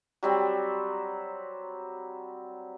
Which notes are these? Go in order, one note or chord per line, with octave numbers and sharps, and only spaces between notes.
F#3 G3 C4